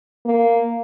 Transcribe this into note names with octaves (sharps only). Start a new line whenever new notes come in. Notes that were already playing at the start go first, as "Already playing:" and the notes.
A#3